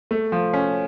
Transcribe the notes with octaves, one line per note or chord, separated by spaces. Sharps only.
A3
F3
C#4